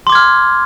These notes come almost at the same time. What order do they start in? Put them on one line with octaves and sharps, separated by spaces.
C6 D6 G#6 F6